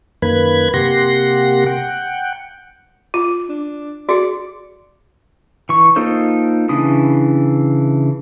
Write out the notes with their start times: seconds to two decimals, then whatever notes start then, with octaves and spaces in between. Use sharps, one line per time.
0.22 F#2 D#3 A#3 B4 B5 G#6
0.74 C3 A#3 G4 F#5 C6 A#6
1.66 F#5 G5
3.14 F4
3.49 D4
4.09 F#4 G#4 D5
5.69 E3 C#6
5.96 A#3 D#4 F4 A4 C5
6.69 C#3 E3 D4 E4 D#6